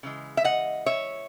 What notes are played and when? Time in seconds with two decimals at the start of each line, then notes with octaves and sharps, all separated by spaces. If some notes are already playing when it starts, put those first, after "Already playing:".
0.03 C#3 E3 G#3
0.37 E5
0.44 D#5 F#5
0.86 C#5 E5